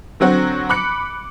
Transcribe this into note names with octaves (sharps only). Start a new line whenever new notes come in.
D3 F#3 C4 F#4
B5 D6 F#6 C#7